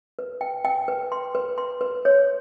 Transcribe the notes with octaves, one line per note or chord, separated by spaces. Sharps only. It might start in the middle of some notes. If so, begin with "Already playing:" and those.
B4
G5
G5
B4
C6
B4
C6
B4
C#5